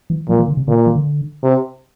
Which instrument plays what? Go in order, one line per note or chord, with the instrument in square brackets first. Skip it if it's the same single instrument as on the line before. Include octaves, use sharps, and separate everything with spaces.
[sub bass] E3
[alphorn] A#2 [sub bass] F3
[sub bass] E3
D3
C3
[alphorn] A#2 [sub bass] D3
[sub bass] E3
D3
[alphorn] C3